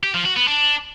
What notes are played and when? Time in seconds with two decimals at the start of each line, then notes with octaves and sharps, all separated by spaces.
0.03 G4
0.14 F3
0.25 F#4
0.36 B3
0.48 D4